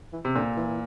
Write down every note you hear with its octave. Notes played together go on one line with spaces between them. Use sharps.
E3
C3
A#2 D3
E3
E3